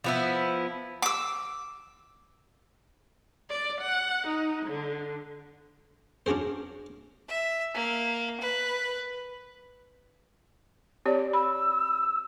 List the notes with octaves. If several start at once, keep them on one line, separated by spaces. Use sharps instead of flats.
F3 B3 E4
D6 E6
D5
F#5
D#4
D3
C#4 D4 F#4 G#4 C5
E5
A#3
B4
C4 G4 C#5 D5
B5 E6